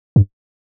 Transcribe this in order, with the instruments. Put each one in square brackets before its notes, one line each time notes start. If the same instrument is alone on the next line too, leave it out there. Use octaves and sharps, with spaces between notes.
[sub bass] G2